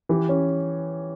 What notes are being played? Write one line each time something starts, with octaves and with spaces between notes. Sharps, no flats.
E3 G4
C#4